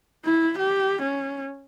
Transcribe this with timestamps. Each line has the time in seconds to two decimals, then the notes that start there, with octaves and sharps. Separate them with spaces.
0.25 E4
0.58 G4
1.02 C#4